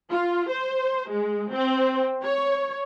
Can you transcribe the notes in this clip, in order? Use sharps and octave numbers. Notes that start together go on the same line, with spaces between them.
F4
C5
G#3
C4
C#5